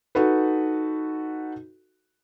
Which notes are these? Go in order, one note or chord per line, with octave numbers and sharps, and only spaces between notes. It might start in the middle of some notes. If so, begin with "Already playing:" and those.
D#4 F#4 A4 B4